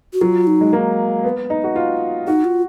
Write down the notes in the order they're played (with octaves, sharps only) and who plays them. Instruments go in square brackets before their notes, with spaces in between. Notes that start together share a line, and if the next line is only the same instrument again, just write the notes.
[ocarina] F#4
[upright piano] F#3 [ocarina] F4
[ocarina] D#4
[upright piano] G#3
A#3
B3
D#4
F#4
F4
[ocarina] D#4 [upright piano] F#4
[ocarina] F4